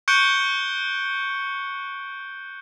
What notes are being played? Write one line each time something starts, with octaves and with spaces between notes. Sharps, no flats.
C#6 F#6 G6 C#7 D7 G7